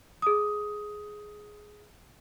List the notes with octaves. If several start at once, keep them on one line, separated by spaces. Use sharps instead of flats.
G#4 D#6